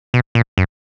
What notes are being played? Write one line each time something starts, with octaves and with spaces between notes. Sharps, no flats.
B2
A#2
F#2